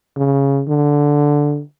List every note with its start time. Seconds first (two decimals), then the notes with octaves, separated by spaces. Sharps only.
0.17 C#3
0.68 D3